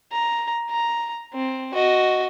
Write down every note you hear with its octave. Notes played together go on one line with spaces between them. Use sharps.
A#5
A#5
C4
F#4 D#5